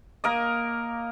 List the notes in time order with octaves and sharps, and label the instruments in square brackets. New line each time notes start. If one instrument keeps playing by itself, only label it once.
[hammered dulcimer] A#3 A#4 D#5